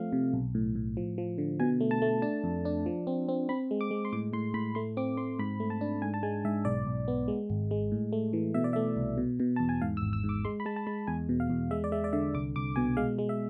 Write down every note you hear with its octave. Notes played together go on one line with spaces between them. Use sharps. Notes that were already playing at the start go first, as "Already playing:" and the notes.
Already playing: F3 A3 C4 F5
C3
B1
A2
A2
F3
F3
D3
B2 G#5
A3
A5
A3
D4 A5
F2
D4
F3
C4
C4
C4 B5
G#3
D6
G#3
C6
A2 D6
A2 C6
A2 B5
A3 C6
C4 D6
C4 C6
G#2 B5
A3
A5
D4
G#2 G#5
A5
G#3 G#5
G#2 E5
B1 D5
B1
B3
G#3
G#1
G#3
A2
A3
E3
B2 E5
D5
A3 E5
C2
B2
B2
E2 A5
G#5
G#2 F5
E6
G#1
E6
G#2
D6
G#3 C6
B5
G#3 A5
A5
G#3 B5
E2 G#5
B2
F5
E2
G#3 E5
D5
G#3 E5
D5
D3 E5
C2 D6
C2 D6
B2 G#5
G#3 F5
G#3
E5